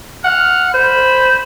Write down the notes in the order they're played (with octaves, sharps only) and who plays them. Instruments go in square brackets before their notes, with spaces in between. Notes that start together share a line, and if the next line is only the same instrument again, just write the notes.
[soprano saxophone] F#5 [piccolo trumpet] F6
[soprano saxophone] C5 [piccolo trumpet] B5